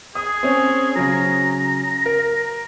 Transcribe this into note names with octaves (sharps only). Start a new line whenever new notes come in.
G#4 D#6
C4 C#4
C#3 F#3 A#5
A#4